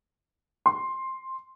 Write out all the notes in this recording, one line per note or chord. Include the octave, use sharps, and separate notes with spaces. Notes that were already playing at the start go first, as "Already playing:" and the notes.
C6